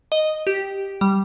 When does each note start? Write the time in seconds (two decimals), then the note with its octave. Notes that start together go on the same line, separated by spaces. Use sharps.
0.12 D#5
0.47 G4
1.01 G3